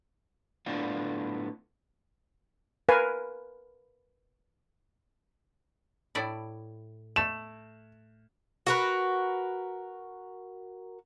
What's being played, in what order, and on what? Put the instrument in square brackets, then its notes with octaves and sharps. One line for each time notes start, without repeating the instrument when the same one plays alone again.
[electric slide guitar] A2 D3 B3 D4 F4
[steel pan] A#4 B4 F5 G#5
[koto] A2 E4 D5
[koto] A3 [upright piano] E7
[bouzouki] F#4 A#4 B4